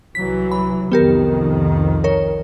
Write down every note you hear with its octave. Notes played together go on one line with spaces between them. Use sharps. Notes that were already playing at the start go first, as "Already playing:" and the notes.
C2 E3 F#3 B6
B5
C2 F2 D#3 B3 G4 A#4
A#4 C#5